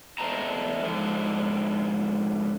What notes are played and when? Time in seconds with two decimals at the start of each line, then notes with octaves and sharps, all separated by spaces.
0.18 E2 A3 C5 D#5 A5 A#5
0.83 G#2 D3 F3